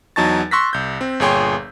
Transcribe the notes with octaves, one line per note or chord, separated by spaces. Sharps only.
E2 F#3 D#4 A5 C#6 A6
C6 C#6 E6 F#6 A#6 B6
C2 G6
C4
G1 A#2 G#4 C#5 G5 C6